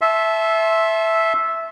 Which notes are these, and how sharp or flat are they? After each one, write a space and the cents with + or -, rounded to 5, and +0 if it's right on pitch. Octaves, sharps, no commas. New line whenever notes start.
E5 +0 A5 -30 C6 +25